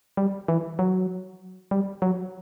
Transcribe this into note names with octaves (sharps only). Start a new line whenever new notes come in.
G3
E3
F#3
G3
F#3